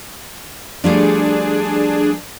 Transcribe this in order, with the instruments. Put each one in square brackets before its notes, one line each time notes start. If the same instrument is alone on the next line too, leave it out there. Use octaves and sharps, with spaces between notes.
[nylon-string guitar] F3 G3 A3 [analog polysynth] D4 G#4